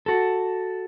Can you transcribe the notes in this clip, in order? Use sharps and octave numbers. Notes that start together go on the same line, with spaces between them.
F#4 A4